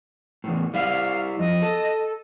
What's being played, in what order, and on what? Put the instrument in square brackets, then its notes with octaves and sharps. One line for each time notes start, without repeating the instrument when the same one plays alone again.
[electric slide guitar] E2 A2
[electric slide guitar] G3 E4 [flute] F5
[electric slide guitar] F2 [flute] D#5
[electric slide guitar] A4